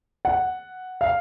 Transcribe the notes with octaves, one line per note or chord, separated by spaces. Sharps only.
F#5
F5